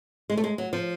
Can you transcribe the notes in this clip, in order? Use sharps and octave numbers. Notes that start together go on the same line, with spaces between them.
G#3
A3
G#3
F#3
F3